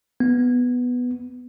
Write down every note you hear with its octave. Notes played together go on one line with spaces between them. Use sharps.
B3